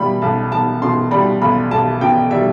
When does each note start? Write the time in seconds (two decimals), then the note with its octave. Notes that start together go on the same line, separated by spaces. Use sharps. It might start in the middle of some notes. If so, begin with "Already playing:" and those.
Already playing: B2 G3 B5
0.22 B1 A5
0.52 B1 A5
0.82 B2 C6
1.11 G3 B5
1.41 B1 B5
1.71 B1 A5
2.01 B2 G5
2.31 G3 E5